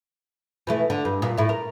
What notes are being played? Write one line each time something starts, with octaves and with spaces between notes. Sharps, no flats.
B2 E3 A3
D3
G2
A#2
A2 E4
A#4